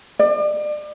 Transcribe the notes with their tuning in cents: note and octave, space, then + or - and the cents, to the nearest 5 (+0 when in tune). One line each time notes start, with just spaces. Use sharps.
D5 +35